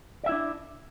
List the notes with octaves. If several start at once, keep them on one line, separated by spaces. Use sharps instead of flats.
D4 E4 D5 E5